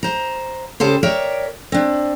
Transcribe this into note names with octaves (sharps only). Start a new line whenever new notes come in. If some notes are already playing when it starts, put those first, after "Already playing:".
C5 A#5
C#3 G4 A4 C5
A#4 C#5 D5 E5 G5
C4 D4